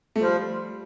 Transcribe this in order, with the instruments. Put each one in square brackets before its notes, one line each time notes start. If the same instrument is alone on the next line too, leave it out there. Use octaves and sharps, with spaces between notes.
[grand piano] A3
[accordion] F3 [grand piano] G3